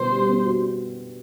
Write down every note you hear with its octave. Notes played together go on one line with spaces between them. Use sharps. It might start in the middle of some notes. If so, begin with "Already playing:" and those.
Already playing: B2 G3 B3 F#4 C5
G3
B3
F#4